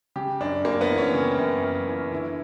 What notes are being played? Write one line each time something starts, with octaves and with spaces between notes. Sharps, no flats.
C#3 G4
F#2 D4
F#2 A#3
B3
E3
C#4
C#3
F#2
F#2
E3
D3 E4